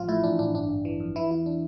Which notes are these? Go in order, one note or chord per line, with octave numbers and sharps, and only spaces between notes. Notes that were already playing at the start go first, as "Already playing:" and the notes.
Already playing: A1 F3 F4
A2 E4
A1 D4
A1 D4
G1 D4
G1
E3
F2
E3 E4
E2 E4
D4